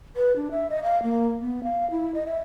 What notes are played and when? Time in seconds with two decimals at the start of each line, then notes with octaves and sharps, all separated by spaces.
0.16 B4
0.36 D4
0.51 E5
0.70 D#5
0.83 F5
1.03 A#3
1.41 B3
1.63 F5
1.91 E4
2.14 D#5
2.26 E5